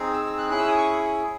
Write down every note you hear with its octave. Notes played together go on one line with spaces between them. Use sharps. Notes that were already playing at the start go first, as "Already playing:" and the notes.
Already playing: C4 D#4 G#4
E6
E6
F#6
C#4 E4 G#4 F#6
E6
D#6
C#6